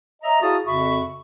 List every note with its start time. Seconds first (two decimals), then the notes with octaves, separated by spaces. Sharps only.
0.23 C#5 D#5 E5 A#5
0.41 E4 F#4 G#4 F5 A5 D#6
0.66 F2 C#3 F#4 E5 B5 C#6